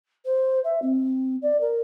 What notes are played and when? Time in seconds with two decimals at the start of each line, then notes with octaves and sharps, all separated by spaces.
0.25 C5
0.64 E5
0.82 C4
1.41 D5
1.60 A#4